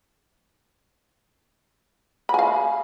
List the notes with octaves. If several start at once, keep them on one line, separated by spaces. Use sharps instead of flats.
F5 G#5 B5